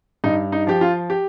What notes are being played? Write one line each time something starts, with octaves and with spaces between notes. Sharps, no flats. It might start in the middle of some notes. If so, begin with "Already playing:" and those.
G2 D#4
D#4
F3 G4
F4
G4